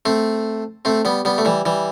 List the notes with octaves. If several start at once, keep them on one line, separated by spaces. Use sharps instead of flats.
A3 C4
A3 C4
G3 B3
G3 B3
A3
E3 G3
E3 G3